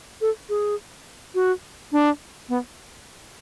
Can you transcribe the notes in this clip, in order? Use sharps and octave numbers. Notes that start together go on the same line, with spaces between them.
A4
G#4
F#4
D4
B3